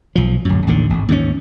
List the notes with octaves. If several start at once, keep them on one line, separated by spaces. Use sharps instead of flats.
B1 F3
D1 F#2
A1 D#2 D3
G#1
D#2 G#2 C#4